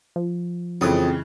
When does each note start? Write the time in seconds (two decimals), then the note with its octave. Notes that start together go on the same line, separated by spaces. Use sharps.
0.16 F3
0.81 F2 C#3 E3 G#3 C4 D#6